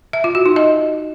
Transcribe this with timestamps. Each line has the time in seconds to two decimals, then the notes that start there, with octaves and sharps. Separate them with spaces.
0.13 E5
0.24 F4
0.35 F#4
0.46 D#4
0.56 D#5